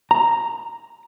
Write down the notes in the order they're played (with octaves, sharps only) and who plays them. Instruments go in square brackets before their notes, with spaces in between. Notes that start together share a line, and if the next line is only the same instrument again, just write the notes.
[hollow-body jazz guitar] A#5